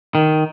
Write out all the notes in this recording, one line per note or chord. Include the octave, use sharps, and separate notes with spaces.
D#3